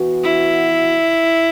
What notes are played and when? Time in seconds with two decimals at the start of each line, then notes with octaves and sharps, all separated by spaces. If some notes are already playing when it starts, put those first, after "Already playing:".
Already playing: E3 B3 F#4
0.23 E4